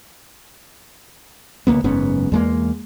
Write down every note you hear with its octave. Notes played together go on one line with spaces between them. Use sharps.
C#2 G#2 A#3 B3
F#1 G#2 B3 C#4
E2 G#3 A#3